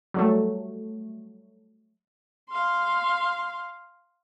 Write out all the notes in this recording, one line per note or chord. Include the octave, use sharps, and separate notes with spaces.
F#3 G3 A3
F5 C6